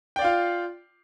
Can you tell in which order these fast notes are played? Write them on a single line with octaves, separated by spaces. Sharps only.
G5 D5 F5 F4